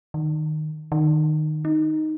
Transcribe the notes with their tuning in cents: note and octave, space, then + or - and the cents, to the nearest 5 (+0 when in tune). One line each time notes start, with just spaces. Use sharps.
D#3 -15
D#3 -20
D#4 +0